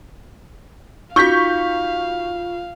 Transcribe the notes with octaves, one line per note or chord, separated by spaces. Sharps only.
D#4 F4 F#4 F5 C#6 G6 B6